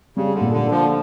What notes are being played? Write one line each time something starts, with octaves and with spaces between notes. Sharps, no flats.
C#3 G3
D3
A#2
D3
D4
D3 F3